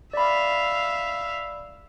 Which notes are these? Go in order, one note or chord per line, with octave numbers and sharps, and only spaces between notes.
D5 E5 F5 B5